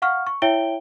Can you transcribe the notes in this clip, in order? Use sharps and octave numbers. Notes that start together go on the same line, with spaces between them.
F5 F#5 C#6 F6
C#6
E4 C#5 E5 G5 D7 G7